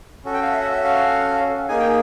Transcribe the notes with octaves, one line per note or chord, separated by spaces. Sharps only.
C#4 F#4 A4
G5
F5
E5
F#5
E5
F5
A#3 D#4 G#4 G#5
G5